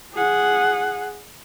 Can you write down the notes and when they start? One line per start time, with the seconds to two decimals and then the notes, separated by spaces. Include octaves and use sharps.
0.13 G#4 F#5